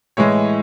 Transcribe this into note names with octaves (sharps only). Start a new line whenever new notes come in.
A2 E3 G#3 C#5